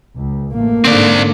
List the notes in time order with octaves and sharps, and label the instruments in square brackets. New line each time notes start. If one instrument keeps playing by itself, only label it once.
[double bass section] C#2
[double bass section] A1 A3 [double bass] A#3
[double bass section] G#2 D3 [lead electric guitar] C4 D5